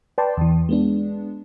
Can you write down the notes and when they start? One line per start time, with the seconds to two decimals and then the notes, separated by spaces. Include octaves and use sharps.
0.18 B4 D5 G5 A5 C6
0.37 E2 E3
0.69 G#3 B3 D4